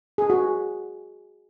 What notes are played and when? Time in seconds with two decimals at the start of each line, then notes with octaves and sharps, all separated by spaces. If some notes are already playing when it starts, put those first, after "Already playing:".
0.18 G#4
0.30 F#4